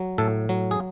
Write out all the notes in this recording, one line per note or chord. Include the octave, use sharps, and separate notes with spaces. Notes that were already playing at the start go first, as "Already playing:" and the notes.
Already playing: F#3
A2 A4
F#3
G#4